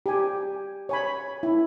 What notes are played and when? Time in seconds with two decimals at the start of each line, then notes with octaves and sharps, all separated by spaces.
0.06 G4 G#5
0.89 C#5 G#5 B5
1.43 E4